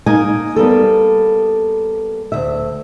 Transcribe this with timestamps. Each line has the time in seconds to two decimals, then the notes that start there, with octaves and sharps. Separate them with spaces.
0.06 A#3 D#4 G#5
0.56 G3 A#3 B3 A4
2.32 D2 E5